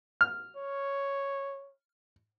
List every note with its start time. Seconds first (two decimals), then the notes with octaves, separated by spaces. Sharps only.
0.21 F6
0.56 C#5